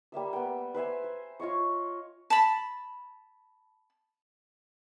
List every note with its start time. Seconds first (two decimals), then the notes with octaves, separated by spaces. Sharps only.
0.12 G3 A#3 E5 E6
0.33 B3 G5
0.74 B4 C5 E5 G#5
1.04 C5
1.40 F4 C#5 D#5 C#6
2.30 A5 B5